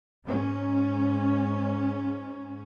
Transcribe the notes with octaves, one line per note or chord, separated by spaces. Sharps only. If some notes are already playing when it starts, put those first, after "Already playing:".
G#2 C#4